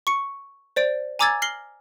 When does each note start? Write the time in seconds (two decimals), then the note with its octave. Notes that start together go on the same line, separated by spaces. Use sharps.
0.07 C#6 C#7
0.76 C5 D5 D7
1.19 G#5 A#5 D6 E6 G#6 A6
1.42 F6 A#6 C7 F#7 G7